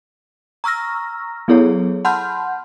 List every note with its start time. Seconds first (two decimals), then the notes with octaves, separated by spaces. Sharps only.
0.64 A#5 C#6 E6 F6 A#6
1.48 F#3 B3 E4 G#4 A4 C#5
2.05 F#5 A5 B5 C6 F6 G6